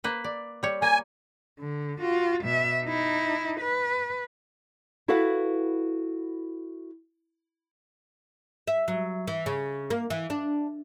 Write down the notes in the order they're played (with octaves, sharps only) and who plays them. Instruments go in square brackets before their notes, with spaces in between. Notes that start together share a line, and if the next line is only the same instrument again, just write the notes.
[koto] A#3 B4 C5
D5
G3 C#5
[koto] A#3 [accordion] G#5
[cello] D3
F4 F#4
B2 E5
D#4 E4
B4
[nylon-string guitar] E4 F#4 A4 B4 F5 F#5
[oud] E5
F#3
E3
C#3
A#3
E3
D4